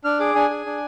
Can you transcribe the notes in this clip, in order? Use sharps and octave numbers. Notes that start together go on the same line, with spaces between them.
D4 F6
G#4 D6
D4 G#5
G#4
D4